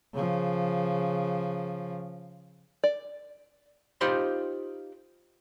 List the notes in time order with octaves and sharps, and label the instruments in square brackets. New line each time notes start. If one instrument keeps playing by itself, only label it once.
[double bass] C#3 F3
[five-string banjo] D5
[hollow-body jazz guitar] D#4 F4 G4 C5 B5 C6